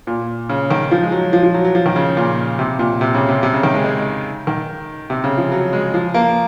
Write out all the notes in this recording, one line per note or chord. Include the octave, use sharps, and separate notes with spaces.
A#2
C#3
D#3
F3
G#3
F#3
F3
F3
F#3
F#3
F3
D#3
C#3
A#2
C3
A#2
C3
C#3
C3
C3
C#3
D#3
G#3
G#3
D#3
C3
C#3
F3
F#3
G#3
F3
A#3